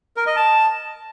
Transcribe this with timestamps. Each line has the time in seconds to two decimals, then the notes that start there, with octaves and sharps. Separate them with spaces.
0.17 A#4
0.27 D#5
0.36 A5